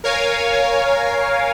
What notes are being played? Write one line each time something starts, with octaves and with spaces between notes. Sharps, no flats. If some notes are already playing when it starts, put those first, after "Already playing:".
A#4 C#5 F5 G#5